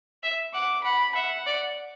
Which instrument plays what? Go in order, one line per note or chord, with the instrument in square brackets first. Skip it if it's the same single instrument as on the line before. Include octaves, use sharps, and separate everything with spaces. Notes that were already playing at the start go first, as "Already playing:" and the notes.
[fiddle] E5
[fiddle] F#5 [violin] D6
[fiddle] F#5 [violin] B5
[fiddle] E5 [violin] F#5
[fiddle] D5